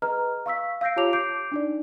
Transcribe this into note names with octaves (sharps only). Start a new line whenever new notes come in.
G#4 B4 D#5 A#5 F6
F5 C#6 E6 B6
F5 E6 G6 A#6 C7 D7
F4 G4 C#5 A5 D6 F7
D6 G6 C7 D7
D4 D#4 D5